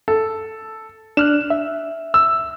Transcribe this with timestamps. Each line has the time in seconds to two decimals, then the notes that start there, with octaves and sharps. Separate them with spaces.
0.08 A4
1.17 D4 F6 F#6 E7
1.50 E5
2.14 E6